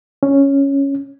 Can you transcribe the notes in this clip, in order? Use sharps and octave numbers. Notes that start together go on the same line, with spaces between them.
C#4